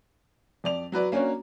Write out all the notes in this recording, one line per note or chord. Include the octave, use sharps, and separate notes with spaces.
F2 D5 F7
F#3 F#4 B4 D5
A#3 C#4 D4 F#4 C#5